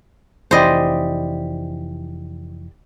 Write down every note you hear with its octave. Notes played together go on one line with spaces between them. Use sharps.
F1 E3 G4 C5 D5 D#5 B5